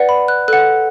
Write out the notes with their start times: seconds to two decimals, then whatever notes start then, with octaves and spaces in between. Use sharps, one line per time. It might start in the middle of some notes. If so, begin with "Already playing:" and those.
Already playing: B4 D5 F#5
0.09 B5
0.28 F#6
0.48 A4 F#5 F#6